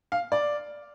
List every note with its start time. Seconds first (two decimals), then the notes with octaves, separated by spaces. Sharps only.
0.12 F5
0.32 D5